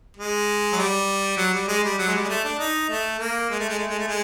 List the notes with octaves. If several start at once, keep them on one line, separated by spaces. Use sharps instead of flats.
G#3
F#3
G3
F#3
G3
G#3
G3
F#3
G#3
G3
G#3
A3
D4
D#4
A3
A#3
G#3
A3
G#3
A3
G#3
A3
G#3